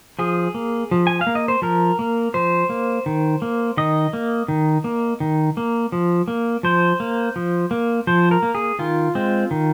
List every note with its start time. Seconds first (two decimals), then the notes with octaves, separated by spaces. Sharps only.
0.19 F3 G#4
0.54 A#3
0.91 F3
1.07 G#5
1.21 F5
1.27 A#3
1.35 D#5
1.48 C5
1.62 F3 A#4
1.99 A#3
2.34 F3 C5
2.69 A#3
3.06 D#3
3.42 A#3
3.77 D#3 D#5
4.13 A#3
4.48 D#3
4.84 A#3
5.20 D#3
5.57 A#3
5.92 F3
6.28 A#3
6.63 F3 C5
7.00 A#3
7.36 F3
7.71 A#3
8.07 F3 C5
8.31 A#4
8.43 A#3
8.55 G#4
8.79 D#3 F4
9.15 G#3 C4
9.51 D#3